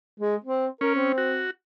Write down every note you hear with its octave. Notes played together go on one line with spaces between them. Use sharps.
G#3
C4
C#4 A#4
C4
F#4